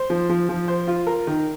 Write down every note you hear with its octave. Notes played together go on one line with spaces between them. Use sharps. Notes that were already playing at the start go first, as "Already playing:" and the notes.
Already playing: C5
F3
F3
F3
C5
F4
A#4
D#3